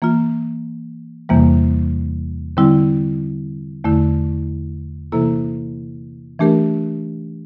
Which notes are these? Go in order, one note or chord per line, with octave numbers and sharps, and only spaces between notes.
E3 A#3 F4
E2 C3 E3 G3 A#3
D3 G3 C4 E4
E2 D3 A3 E4
C3 E3 A#3 E4 A4
E3 A3 D4 G4 A#4